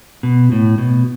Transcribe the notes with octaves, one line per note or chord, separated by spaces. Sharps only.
B2
A2
B2